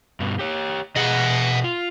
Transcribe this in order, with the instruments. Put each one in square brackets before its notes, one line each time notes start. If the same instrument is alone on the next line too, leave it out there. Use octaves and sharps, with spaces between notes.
[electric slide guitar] G2 B2
G4 C#5
[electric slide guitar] B2 G#4 [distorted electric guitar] D#5 F#5
[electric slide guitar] F4